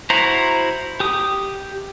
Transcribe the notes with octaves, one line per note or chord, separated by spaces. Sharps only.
E4 F#4 C5 A#5
G4 D#6